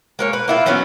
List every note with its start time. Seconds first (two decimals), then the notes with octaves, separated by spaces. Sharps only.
0.19 G#3 A#3 C#5
0.33 B4
0.48 A#3 E4 F4
0.66 E3 F#3 B3 C#4